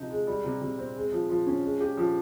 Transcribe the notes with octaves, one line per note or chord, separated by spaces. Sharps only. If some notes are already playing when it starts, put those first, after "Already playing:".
Already playing: C3 F3 D#4
G#3
G3
C3
C3
C4
G#3
F3
F3
C#4
G#3
G4
F3